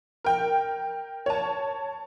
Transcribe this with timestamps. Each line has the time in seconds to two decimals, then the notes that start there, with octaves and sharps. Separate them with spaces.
0.25 A#4 G5
1.26 C#5 A5